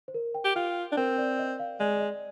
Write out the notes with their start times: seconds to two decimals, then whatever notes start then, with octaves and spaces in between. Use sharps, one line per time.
0.08 C5
0.14 A#4
0.35 G5
0.45 G4
0.56 F4 G5
0.92 D4
0.97 C4 A#4
1.18 D5
1.39 D#5
1.59 F5
1.80 G#3 D5
1.95 D5
2.01 D#5